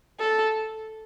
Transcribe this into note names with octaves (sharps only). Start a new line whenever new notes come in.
A4